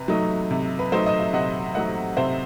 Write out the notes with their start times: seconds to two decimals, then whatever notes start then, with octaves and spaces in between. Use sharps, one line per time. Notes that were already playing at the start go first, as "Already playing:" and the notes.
Already playing: C3 B4
0.08 F#3 A3 D#4
0.51 C3
0.79 B4
0.92 F#3 A3 D#4 C5
1.06 D#5
1.19 E5
1.33 C3 D#5 F#5
1.75 F#3 A3 D#4 D#5 F#5
2.17 C3 C5 E5